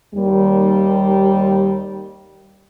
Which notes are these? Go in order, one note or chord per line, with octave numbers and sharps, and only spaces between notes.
D#2 G3